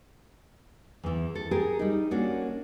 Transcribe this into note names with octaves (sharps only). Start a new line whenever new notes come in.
E2 E3
A4
G4 G#4 A#4
G3 D#4
A#3 C#4 D4 F#4